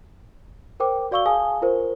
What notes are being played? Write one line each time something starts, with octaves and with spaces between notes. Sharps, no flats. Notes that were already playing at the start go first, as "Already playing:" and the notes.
A#4 C5 G5 D6
F#4 D5 F5 C#6 E6 G7
G#4 F5 G#5 A5 D#6
F4 A#4 C5